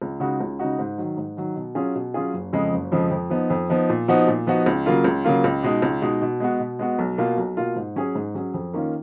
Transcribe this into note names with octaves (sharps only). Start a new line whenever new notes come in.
C#2
C#3 G#3 D#4 F#4
C#2
C#3 G#3 D#4 F#4
G#2
D#3 F#3
G#2
D#3 F#3
B2
F#3 C#4 F4 G#4
B2
F#3 C#4 F4 G#4
F#1
F2 C#3 F3 G#3
F#1
F2 C#3 F3 G#3
F2
F3 B3 D#4
F2
F3 B3 D#4
A#2
F3 B3 D#4 F#4
A#2
F3 B3 D#4 F#4
C#2
C#3 F#3 A#3 F4
C#2
C#3 F#3 A#3 F4
C#2
B2 G#3 D#4
C#2
B2 G#3 D#4
B2
G#3 B3 F#4
B2
G#3 B3 F#4
B1
B2 A#3 F4
B1
B2 A#3 F4
G#2
F#3 C#4 G#4
G#2
F#3 C#4 G#4
F2
D#3 A#3 C#4 F4